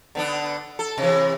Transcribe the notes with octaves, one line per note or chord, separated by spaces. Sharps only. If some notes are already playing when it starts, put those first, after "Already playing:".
D3 B3 D4
A4
C3 E3